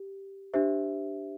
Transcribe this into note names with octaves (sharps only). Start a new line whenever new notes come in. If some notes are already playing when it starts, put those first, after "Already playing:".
Already playing: G4
D4 G4 C5 E5